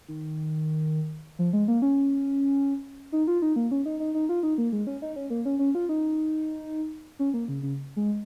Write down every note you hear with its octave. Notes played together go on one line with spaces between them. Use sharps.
D#3
F3
G#3
A#3
C#4
D#4
F4
D#4
A#3
C#4
D#4
D#4
D#4
F4
D#4
A#3
G#3
C#4
D#4
C#4
A#3
C#4
C#4
F4
D#4
C#4
A#3
C#3
C#3
G#3